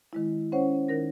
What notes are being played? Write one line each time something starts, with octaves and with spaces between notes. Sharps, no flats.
D#3 G#3 E4
C#4 C5 C#5 F#5
D#3 D#4 A#4 A#6